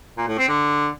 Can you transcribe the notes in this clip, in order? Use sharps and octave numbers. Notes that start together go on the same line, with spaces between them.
A#2
A2
C4
D3